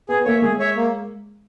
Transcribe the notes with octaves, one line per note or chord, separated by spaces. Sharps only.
B3 G#4
A#3 C#5 E5
G#3 G#4
C#5 E5
A#3